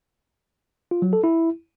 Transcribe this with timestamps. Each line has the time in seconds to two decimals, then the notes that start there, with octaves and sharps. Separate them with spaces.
0.91 F4
1.02 F#3
1.13 A4
1.24 E4